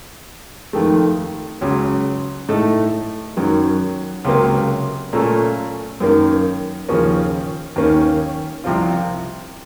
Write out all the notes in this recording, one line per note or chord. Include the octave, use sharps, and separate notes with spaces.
F2 D#3 A3
C#2 C#3 F#3
A2 A3 D#4 A4
F#2 D#3 F#3
C#2 C3 F#3 A#3
A#2 A3 C#4 A4
F#2 D#3 A#3
D#2 C#3 F3 A#3 C#4
D#2 D#3 A#3 C#4
C2 C3 F3 C4 F4